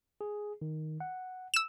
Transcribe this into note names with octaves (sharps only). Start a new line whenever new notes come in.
G#4
D#3
F#5
E6 E7